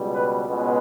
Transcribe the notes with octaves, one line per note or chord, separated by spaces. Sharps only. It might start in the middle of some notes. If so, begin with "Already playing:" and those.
Already playing: C#2 B2 G3
B4
C#2 B2 G#3 B3 B4